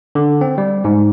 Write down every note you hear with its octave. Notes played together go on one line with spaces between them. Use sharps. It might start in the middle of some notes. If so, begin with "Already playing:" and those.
D3
C4
G3
G#2